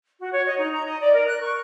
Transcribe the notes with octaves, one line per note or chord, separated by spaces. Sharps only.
F#4
C#5
D#5
D#4
A#5
D#5
D5
A#4
F#6
C#6